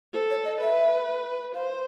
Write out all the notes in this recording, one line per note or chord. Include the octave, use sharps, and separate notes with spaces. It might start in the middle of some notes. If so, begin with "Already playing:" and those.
A4 C5
C#5
D#5
B4 E5
C5 F5